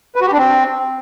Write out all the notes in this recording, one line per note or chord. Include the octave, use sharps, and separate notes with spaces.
B4
F#4
G4
D4
C4